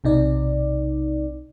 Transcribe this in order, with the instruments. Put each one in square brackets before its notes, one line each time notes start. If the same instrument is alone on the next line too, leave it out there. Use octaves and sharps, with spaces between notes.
[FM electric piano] B1 C3 D#4 D5